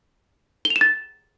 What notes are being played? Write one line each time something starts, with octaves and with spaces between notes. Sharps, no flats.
G7
F7
E7
A6